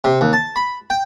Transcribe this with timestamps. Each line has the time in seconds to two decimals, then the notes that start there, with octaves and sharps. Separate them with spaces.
0.04 C3
0.21 D#2
0.33 A5
0.56 B5
0.90 G5